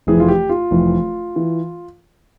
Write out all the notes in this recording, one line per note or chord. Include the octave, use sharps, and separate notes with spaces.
F1 F2 E3 G#4
F4
G4
F4
F1 F2 E3
E3